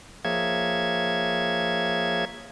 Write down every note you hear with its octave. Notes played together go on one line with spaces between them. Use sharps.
F3 A#3 G#4 C#5 E5 G#6